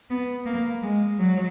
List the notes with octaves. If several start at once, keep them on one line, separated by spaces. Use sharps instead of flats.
B3
A#3
G#3
F#3